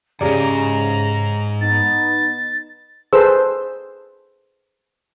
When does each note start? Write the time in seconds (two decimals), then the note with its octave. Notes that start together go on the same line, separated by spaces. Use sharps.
0.21 F2 G#2 C#3 G4 G#4 D5 A#5
1.61 B3 D#4 A6
3.13 G#4 A4 B4 C5 E6